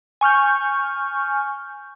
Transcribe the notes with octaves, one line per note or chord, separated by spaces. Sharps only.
G#5 C#6 F6 G6